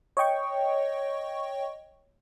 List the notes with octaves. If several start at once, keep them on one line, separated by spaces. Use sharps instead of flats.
C#5 D#5 G5 C#6